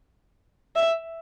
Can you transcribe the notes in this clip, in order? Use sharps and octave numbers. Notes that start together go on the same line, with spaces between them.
E5